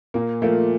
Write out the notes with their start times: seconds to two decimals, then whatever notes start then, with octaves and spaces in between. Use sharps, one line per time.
0.14 A#2 A#3
0.42 F3 A3 A#3